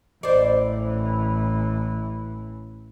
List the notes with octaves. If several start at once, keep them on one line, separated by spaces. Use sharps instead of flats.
A1 E3 C5 D5